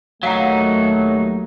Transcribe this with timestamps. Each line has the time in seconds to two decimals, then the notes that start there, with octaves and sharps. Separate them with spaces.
0.23 D#2 F#3 A3 D#4 F5 F#5 A#5